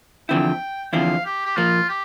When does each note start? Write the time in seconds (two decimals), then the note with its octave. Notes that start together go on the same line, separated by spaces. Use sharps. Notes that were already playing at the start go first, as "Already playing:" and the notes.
0.29 E2 D3 F3 C4 E4 G5
0.93 E2 D3 F3 C4 E4 F5
1.25 G4
1.46 G4
1.56 A#2 F3 A#3 F4
1.89 G4